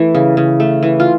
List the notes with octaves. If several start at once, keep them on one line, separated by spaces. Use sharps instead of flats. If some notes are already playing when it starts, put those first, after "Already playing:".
Already playing: E3 A3
C#3
C#3
A3
E3
F4